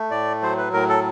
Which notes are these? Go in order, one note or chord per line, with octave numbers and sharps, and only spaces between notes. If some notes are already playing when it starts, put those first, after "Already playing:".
Already playing: A3
A2 D5
F#3 C5
B4
A2 A#4
A4